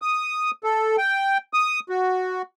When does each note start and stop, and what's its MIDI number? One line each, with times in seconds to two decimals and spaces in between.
0.02 0.51 87
0.64 0.96 69
0.98 1.38 79
1.53 1.80 87
1.89 2.42 66